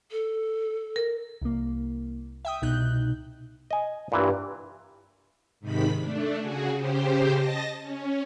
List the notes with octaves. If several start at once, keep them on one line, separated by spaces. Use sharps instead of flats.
A4
A#4
C2 A#3
E5 G5 D#6
C2 B2 D#4 F#6 G6
D#5 G#5
G2 A#2 E3
G#2 C3 D#3 B5 B6
A3 D4
C#3 F#4 G#4
C#3 G4 C5
D#5 A5 A#6
C#4